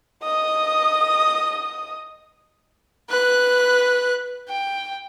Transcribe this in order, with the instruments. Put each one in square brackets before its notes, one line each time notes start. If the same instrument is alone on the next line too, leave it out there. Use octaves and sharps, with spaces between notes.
[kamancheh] D#5 D#6
B4 F#6
G5